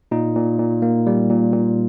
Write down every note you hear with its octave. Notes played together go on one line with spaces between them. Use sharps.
A#2 D#4
A#2
A#2
A#3
G3
A#2
A#2